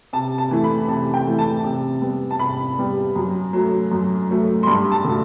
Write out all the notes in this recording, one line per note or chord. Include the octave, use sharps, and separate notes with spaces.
C3 A5
A5
E3 A3
B5
C3 A5
G5
E3 A3
A5
C3
G3 B3
A5
C3 B5
G3 B3
F#2
F#3 A3
F#2
F#3 A3
C6
G2 B5
A5
D3 F#3 A3